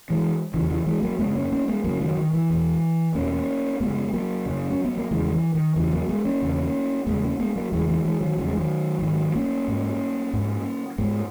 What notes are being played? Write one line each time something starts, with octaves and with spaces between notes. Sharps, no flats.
E3 G#3
E2 C#3 E3
E3
E3 G#3
F#3 A#3
F#2 C#3 G#3 B3
A#3 C#4
A#3 C#4
G#3 B3
F#2 C#3 F#3 A#3
D#3 F#3
D#3
E3
E2 B2
E2 B2 A#3 C#4
F#2 C#3 G#3 B3
F#3 A#3
F#2 C#3
C#4
B3
A#3
E2 C#3 E3 G#3
E3
D#3
E2 C#3 E3
F#3 A#3
G#3 B3
A#3 C#4
E2 C#3
E2 C#3 G#3 B3
A#3 C#4
G#3 B3
F#3 A#3
E2 C#3 E3 G#3
E3 G#3
E3 G#3
D#3 F#3
E2 C#3 F#3
G#3
D#3 F#3
E3
G#2 D#3 F#3
A#3 C#4
G#2
G#2
G#2 G#3 B3